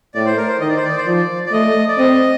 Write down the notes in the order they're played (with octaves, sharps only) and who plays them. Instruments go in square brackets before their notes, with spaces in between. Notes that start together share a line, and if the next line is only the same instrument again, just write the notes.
[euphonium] A2 [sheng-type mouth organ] D5
[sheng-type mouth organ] C5
A#4
C5
[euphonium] D#3 [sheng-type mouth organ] D#5
[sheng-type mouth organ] D5
C5
D5
C5
[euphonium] F3 [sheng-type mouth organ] D5
[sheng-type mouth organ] D5
[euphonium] A3 [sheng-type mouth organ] D#5
[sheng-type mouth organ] D5
[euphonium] C4 [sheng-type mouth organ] D#5